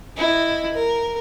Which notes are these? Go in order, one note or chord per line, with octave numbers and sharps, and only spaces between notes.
E4 D#5
A#4